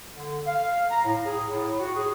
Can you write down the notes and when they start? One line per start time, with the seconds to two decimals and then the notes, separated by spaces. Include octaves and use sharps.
0.16 D3
0.47 F5
0.90 A#5
1.05 A2
1.26 G#4
1.49 A2
1.79 F#4
1.95 G#4